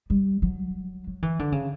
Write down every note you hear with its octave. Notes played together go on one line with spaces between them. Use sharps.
G3
F#3
F#3
E3
D3
C#3